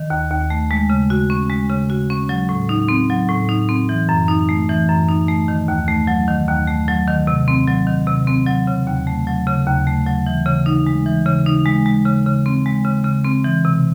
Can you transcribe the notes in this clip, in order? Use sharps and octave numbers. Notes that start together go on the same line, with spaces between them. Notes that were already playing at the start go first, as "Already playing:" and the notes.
Already playing: D#3
D#2
D#2
A3
G#3
C#3
F#4
C#4
G#3
C#3
F#4
C#4
F#3
A2
D#4
C4
F#3
A2
D#4
C4
E3
F#2
D#4
A3
E3
F#2
D#4
A3
D#3
D#2
A3
F#3
D#3
D#2
A3
F#3
D#3
C3
C4
F#3
D#3
C3
C4
F#3
C#3
D#2
A3
F#3
C#3
D#2
A3
F#3
E3
C#3
D#4
G#3
E3
C#3
D#4
G#3
G#3
C#3
C#3
C4
G#3
C#3
C#3
C4
E3
C3